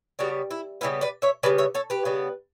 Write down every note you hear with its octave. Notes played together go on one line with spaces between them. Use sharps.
C#3 G3 B3 D4 F#4
E4
C#3 G3 B3 E4
B4 D5
C#5 E5
C#3 G3 B3 B4 D5
C#5 E5
A4 C#5
G4 B4
C#3 G3 B3